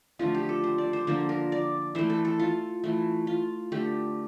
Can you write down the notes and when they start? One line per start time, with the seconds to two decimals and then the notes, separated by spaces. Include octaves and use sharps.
0.19 D3 F3 A3 F4
0.35 G4
0.49 A4
0.64 C5
0.78 D5
0.93 C5
1.07 D3 F3 A#3 C5
1.29 A#4
1.52 D5
1.95 E3 A3 C5
2.10 A4
2.25 A4
2.39 F4
2.84 E3 A3
3.27 F4
3.72 D3 A3 G4